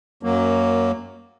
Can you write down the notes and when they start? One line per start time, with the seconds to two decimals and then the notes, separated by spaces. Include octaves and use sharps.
0.23 F#2 F#3 A#3